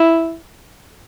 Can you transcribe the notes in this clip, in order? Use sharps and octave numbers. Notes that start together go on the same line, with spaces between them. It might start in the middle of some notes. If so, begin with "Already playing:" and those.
Already playing: E4